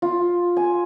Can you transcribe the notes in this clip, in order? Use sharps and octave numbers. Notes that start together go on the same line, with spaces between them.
F4
G#5